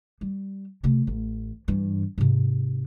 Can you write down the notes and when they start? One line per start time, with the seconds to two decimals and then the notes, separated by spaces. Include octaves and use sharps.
0.21 G3
0.83 C3 A3
1.07 A1
1.68 G2 E3
2.18 G#2 C3